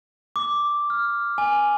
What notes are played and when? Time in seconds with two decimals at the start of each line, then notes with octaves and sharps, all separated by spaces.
0.36 D6
0.90 F6
1.38 G#5